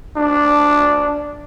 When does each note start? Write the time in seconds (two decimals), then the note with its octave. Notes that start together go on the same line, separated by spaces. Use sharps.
0.16 D4